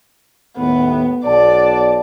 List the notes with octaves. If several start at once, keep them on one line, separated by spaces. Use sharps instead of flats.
D#2 A2 B3
B1 D5 F#5 A5